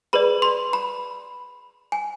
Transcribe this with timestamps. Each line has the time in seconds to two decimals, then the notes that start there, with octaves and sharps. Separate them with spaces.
0.13 G#4 B4 D5 B5
0.42 C6
0.73 B5
1.92 G#5